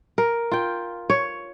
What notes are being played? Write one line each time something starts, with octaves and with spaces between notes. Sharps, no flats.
A#4
F4 G5
C#5